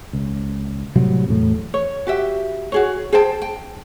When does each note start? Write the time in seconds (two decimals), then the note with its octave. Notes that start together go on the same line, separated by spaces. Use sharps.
0.13 C#2
0.95 A2 C3 F#3 G3
1.29 E2 A2
1.74 C#5
2.07 F#4 G4 E5
2.72 F#4 G#4 C#5
3.13 G#4 C5 G5 A5
3.42 G5